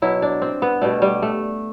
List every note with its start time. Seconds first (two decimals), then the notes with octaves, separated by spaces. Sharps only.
0.02 B2 F#3 E4
0.22 D4
0.42 C4
0.62 B3
0.81 B2 G3 A3
1.02 G3
1.22 A3